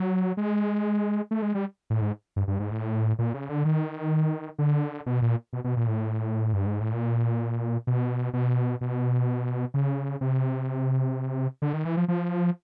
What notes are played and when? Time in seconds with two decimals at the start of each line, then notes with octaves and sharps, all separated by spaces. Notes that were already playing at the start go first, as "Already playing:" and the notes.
Already playing: F#3
0.37 G#3
1.31 A3
1.42 G#3
1.55 G3
1.90 A2
2.01 G#2
2.36 G2
2.48 G2
2.60 G#2
2.71 A2
3.19 A#2
3.34 C#3
3.49 D3
3.65 D#3
4.59 D3
5.06 B2
5.22 A#2
5.53 B2
5.64 B2
5.77 A#2
5.88 A2
6.53 G2
6.66 G#2
6.80 A2
6.93 A#2
7.87 B2
8.33 B2
8.81 B2
9.74 C#3
10.21 C3
11.62 D3
11.73 D#3
11.85 E3
11.97 F3
12.08 F3